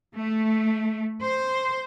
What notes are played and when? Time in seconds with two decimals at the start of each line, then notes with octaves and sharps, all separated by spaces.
0.15 A3
1.23 C5